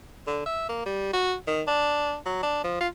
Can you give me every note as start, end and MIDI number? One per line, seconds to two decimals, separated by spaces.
0.27 0.45 50
0.46 0.66 76
0.69 0.85 58
0.86 1.12 55
1.13 1.35 66
1.48 1.62 51
1.68 2.16 62
2.26 2.41 54
2.43 2.62 62
2.64 2.80 53
2.81 2.88 65